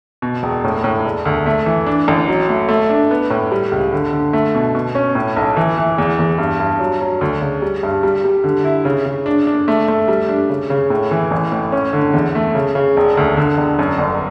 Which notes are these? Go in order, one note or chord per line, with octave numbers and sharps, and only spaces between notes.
B2
E1
A2
A2
E1
D2
A3
E3
D4
A1
F#3
A3
A3
D4
B3
A2
G3
C#2
D3
D3
A3
B2
B2
C#4
A2
B1
E3
E3
E2
E2
G2
G2
F#3
F#3
D2
C#3
G3
G2
G3
G3
D3
E4
C#3
C#3
D4
D4
A3
A3
G3
D4
C#3
C#3
A2
E3
A1
A2
C#4
D3
E2
A3
C#3
C#3
E1
D2
D3
E1
F#2
G1